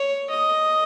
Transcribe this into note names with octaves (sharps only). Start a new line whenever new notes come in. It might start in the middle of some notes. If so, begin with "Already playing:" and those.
Already playing: C#5
D#5